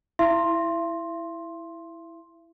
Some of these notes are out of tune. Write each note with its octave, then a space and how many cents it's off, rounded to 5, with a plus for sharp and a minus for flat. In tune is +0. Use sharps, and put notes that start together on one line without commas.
E4 +0 E5 +45 C6 +10